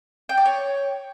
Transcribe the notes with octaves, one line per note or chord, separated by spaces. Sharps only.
G5
D5
C#5